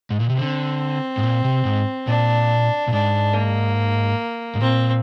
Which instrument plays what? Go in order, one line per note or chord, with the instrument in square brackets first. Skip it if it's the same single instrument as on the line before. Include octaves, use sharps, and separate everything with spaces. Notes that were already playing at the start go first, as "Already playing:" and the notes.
[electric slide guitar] G#2
A#2
C3
[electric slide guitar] D3 [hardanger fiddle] C4
[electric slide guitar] G#2
A#2
C3
G#2
[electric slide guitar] A#2 [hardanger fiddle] D4
[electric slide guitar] A#2
[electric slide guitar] G#2 [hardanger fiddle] D4
[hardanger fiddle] A#3
[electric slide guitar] G#2
[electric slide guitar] A#2 [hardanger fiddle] C4